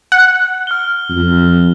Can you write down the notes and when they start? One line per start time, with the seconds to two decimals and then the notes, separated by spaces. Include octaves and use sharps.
0.12 F#5
0.67 F6 G7
1.10 F2